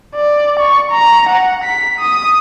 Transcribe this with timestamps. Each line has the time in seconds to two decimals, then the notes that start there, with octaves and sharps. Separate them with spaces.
0.15 D5
0.60 C#6
0.92 A#5
1.29 F#5
1.64 B6
2.00 D#6